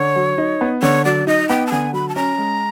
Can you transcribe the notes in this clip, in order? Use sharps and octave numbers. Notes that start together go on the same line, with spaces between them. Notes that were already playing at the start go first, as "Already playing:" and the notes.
Already playing: D3 C#5
F#3
D#4
B3
D3 C#5
F#3 D5
D#4 D#5
B3 G5
A5
D3 G#5
F#3 B5
A5
C#4 A#5
G#3